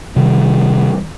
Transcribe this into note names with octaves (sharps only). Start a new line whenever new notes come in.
C3 D#3 G3